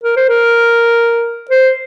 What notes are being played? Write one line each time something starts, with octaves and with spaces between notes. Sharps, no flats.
A#4
C5
A#4
C5